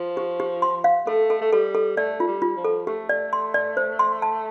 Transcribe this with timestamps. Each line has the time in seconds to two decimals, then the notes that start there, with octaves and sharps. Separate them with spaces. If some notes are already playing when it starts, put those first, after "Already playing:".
Already playing: F3
0.17 G4
0.40 G4
0.62 C6
0.84 F5
1.07 A3 A4
1.30 A4
1.41 A3
1.53 G3 A4
1.75 A4
1.96 A3 D5
2.20 F4
2.27 G3
2.42 F4
2.56 F3
2.65 A4
2.87 A3 G4
3.09 D5
3.33 C6
3.54 D5
3.77 C5
3.99 C6
4.22 A5